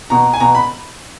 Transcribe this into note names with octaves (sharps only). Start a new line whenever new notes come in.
B2 A#5
G#5
B2 A#5
B5